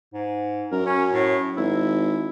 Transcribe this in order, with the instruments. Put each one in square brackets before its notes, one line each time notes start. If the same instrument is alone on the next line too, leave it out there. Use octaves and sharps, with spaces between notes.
[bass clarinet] G#2
[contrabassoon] F#2 [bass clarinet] A#4
[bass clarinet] C#4
A2
[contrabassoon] G#1 [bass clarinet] E4